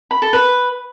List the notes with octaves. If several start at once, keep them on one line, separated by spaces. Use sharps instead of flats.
B5
A4
B4